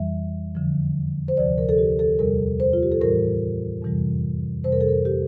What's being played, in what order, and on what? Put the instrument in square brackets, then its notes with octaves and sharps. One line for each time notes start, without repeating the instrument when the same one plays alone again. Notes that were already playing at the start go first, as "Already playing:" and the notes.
Already playing: [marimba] F2 E3 G3 E5
E2 D3 F3
C5
D2 C3 F3 D5
A#4
A4
G4
A4
E2 C3 G3 A#4
C5
F4
G4
A4
A2 E3 G3 A#4
F2 C3 E3 G3
F2 C3 G3 C5
A#4
A4
A#4
G4